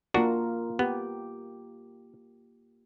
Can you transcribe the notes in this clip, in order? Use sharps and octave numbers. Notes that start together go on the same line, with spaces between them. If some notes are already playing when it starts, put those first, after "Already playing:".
A#3 D4 F4 F#4 A#4
B3 G4